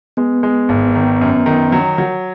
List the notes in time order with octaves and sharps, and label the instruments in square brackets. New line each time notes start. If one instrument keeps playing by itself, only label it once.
[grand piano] G#3 [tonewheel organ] B3
[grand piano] G#3
G#1
D#3
F#2
D#3
F#3
F#3